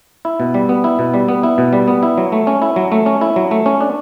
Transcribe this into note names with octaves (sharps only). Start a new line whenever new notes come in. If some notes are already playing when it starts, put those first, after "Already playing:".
E4
B2
G3
B3
E4
B2
G3
B3
E4
B2
G3
B3
E4
F#3
A3
C#4
E4
F#3
A3
C#4
E4
F#3
A3
C#4
D4